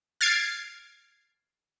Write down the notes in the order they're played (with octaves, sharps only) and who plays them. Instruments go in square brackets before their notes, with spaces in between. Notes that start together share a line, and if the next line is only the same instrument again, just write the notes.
[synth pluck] F6 G#6 A6 C7 D7